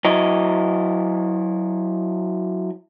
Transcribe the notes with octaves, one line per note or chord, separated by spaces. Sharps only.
F#3 E4 D#5